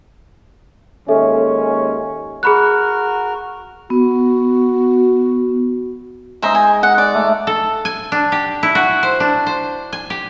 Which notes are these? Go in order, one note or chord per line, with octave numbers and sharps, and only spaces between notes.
D#2 G#3 C#4 A4 E5
F#4 G#4 A#4 B5 F6 F#6
B3 F#4
G#3 D#4 C5 E5 A#5
G#5
F#5
D5
A3
A4
G#5
D4
G4
E4
F#4
C5
D4
C5
G#5
G4